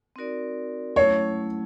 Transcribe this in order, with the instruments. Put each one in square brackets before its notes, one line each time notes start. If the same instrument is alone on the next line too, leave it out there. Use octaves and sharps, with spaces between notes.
[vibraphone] C4 D#4 F#4 A#4 D5
[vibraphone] F#3 A3 C#4 E4 [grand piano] C#5